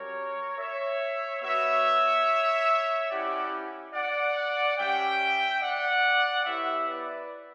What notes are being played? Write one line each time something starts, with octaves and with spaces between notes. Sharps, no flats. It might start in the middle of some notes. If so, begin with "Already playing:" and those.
Already playing: G3 C#4 F#4 A#4 C#5
C#5 E5
B3 F#4 C#5 E5
C#4 E4 G4 D5 F#5
D5 F#5
G3 C#4 G4 E5 G5
D5 F#5
B3 E4 G4 C#5 E5
B4 D5